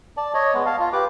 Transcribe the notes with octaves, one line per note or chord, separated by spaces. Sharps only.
D5 A5
C#5 D#5
G#3 B3
F5 A5
F4
G4 B4 D6